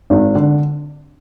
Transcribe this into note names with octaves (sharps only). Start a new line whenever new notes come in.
G#1
D3